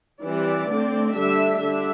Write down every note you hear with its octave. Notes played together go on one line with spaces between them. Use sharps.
E3 G3 C4 D5
D3 A3 C4
D3 G3 D4 E5
D3 G3 D4 E5